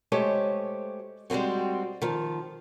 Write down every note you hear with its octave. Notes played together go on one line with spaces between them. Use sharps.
G#3 A3 G4 C5 C#5
G3 G#3 A#3 C4 F#4
D#3 F3